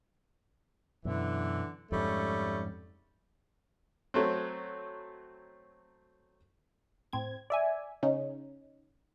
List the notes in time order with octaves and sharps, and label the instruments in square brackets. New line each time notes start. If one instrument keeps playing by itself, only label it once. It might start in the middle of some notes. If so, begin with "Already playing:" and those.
[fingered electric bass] F#2 B2 [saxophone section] D3 E3
[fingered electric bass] F2 G#2 [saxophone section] G3 A3 C#4
[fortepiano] F#3 A3 C4
[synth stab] A2 C4 G#6
D5 E5 G#5
C#3 C#4 D#4